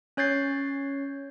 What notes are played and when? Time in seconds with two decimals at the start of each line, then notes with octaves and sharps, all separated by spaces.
0.17 C#4 C#5 G6 A6 C7